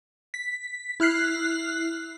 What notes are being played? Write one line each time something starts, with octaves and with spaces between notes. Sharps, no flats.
B6
E4 F6 F#6 C7